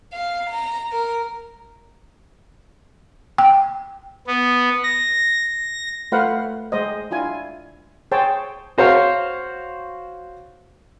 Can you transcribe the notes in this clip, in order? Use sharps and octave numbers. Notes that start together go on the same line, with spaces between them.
F5
A#5
A#4
G5
B3
A#6
A3 F4 B4 C5 F5 F#5
G#3 C5 D#5
D4 E4 F4 G#5
G#4 C5 C#5 G5 A5
F#4 C5 C#5 F5